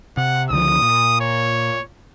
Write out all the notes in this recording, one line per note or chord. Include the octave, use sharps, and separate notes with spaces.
C3 F#5
C#2 D3 F3 D#6
A#2
C#5